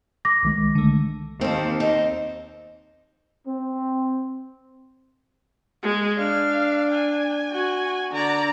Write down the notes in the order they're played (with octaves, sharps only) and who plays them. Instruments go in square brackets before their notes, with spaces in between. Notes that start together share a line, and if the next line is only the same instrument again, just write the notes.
[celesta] D6 A#6
[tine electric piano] C2 D#3 G#3
[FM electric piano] D3 A3
[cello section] D#2 [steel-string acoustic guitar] C4 A4
[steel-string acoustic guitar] C4 D#4
[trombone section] C4
[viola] G#3
[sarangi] D4 [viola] F5
[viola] G#5
[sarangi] F#4
[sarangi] D3 [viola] D5 A#5